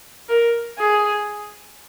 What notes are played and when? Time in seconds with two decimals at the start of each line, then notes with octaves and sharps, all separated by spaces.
0.29 A#4
0.79 G#4